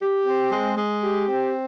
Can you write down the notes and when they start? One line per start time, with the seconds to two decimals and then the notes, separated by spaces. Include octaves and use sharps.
0.01 G4
0.26 C4
0.51 G#3
0.76 G#3
1.02 G4
1.28 C4